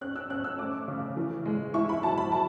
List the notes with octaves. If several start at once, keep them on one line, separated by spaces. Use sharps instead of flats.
C#4 F#6
E6
C#4 F#6
E6
A3 D6
C#3
E3
G#3
E4 C#6
B5
F#3 A5
B5
F#3 A5